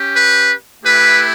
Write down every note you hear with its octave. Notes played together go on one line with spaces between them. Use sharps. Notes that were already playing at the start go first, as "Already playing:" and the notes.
Already playing: C#4 G4
B4
A3 E4 G4 B4